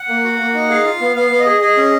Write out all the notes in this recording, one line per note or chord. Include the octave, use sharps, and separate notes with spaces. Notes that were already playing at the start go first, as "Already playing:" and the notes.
Already playing: F#5
A#3
F#4
A#3
D#4
G#4 F5
F4
B3
B3 F5
B3
D#5
G#4
G#4 D#5
C#4